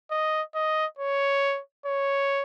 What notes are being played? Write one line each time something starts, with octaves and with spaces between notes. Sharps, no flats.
D#5
D#5
C#5
C#5